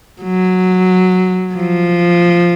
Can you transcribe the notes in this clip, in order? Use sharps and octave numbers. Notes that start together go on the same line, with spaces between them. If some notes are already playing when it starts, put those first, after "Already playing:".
F#3
F3